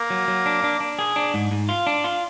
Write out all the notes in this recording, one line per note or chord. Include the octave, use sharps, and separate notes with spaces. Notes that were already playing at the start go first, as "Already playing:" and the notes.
Already playing: A#3
F#3
F#3
D4
D4
D4
G#4
D4
G#2
G#2
F4
D4
F4